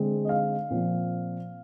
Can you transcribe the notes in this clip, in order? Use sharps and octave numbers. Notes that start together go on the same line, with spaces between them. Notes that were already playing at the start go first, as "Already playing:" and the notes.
Already playing: D3 G#3 C4
D#5
F5
A#2 F3 C4